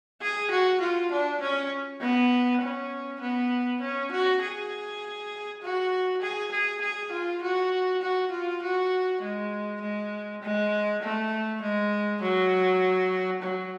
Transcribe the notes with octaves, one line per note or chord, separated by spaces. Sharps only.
G#4
F#4
F4
D4
C#4
B3
C#4
B3
C#4
F#4
G#4
F#4
G#4
G#4
G#4
F4
F#4
F#4
F4
F#4
G#3
G#3
G#3
A3
G#3
F#3
F#3